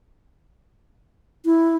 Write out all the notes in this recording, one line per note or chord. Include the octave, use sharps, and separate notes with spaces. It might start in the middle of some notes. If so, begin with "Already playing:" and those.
E4